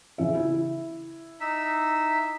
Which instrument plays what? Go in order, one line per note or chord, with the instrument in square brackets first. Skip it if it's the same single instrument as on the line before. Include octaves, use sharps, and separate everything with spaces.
[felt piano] C#3 E3 E5
E4
[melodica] D#4 E5